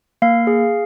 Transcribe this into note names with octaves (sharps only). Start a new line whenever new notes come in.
A#3 F5
G#4